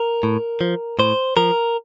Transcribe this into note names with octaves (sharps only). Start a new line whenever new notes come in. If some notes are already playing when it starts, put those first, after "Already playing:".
Already playing: A#4
A2
F3
A2 C5
F3 A#4